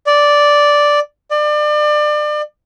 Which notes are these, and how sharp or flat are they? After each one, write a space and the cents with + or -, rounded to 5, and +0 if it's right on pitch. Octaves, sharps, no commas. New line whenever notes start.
D5 -5
D5 +30